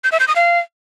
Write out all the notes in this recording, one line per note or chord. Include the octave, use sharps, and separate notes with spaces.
G6
E5
G6
D#6
F5